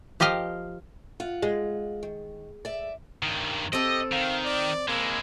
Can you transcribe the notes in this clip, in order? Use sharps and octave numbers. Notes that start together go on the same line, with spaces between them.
F3 G4 A#4 D#5 F5
F4 F#5
G#3
D#3
D5 E5
G2 D#3
C4 G4 A4 D#5
D#3 F5
D5
G#3 A#3 E4